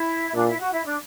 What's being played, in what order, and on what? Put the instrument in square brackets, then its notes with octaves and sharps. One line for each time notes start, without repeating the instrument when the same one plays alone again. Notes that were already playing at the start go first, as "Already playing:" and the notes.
Already playing: [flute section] E4
[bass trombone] A#2 [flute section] D4
[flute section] E4
F#4
E4
D4